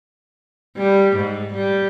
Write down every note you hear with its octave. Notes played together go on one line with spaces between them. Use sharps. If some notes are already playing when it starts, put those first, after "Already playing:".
G3
G#2
G3